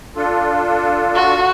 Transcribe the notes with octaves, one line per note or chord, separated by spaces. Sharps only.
D4 F4 A4
F#4